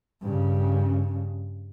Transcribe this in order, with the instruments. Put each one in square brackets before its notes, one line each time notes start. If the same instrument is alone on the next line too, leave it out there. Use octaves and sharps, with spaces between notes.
[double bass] G2 C#3